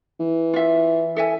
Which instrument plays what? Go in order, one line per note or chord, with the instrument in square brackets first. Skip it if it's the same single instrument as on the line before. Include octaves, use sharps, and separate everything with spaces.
[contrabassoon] E3
[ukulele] F4 E5
A4 E5 G#5